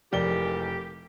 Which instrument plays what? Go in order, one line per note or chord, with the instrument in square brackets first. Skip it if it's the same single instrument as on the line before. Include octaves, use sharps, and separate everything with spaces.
[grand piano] F1 G7 [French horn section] G#2 E3 A#4 [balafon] F3 [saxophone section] G4